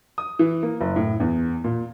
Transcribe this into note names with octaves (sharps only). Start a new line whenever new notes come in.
D#6
E3
A#3
F#1
A2
E2
A#2